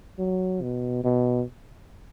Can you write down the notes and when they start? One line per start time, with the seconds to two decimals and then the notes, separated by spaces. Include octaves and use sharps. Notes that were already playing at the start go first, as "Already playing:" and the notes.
0.19 F#3
0.62 B2
1.04 B2